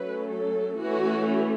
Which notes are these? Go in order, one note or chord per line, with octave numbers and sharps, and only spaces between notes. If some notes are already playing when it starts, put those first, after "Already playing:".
Already playing: F#3 A3 C#4 B4
A4
E3 A3 C#4 F#4